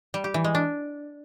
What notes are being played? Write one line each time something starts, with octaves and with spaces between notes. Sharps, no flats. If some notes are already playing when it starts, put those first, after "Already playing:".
G3
G4
E3
G#3
D4